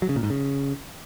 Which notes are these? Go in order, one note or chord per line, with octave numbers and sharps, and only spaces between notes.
F#3
C#3
A#2
G#2
C#3